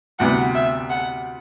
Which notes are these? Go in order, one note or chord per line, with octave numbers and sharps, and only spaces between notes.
D2 C3 G3 B3 F#5
E5
F#5